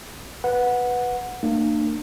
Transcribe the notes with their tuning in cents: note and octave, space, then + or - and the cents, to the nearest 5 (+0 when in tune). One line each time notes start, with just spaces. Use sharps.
B4 +0 F#5 -15
A#3 -30 D4 +40